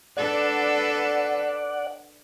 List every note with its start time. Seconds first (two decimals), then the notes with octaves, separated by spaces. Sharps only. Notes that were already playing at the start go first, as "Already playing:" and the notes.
0.17 D4 A4 B4 D5 F#5